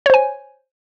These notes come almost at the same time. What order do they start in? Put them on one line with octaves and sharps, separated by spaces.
C#5 C5 G#5